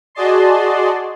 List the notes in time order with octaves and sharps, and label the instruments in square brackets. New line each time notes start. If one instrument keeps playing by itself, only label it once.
[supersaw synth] F#4 G#4 D5 D#5 A5 C6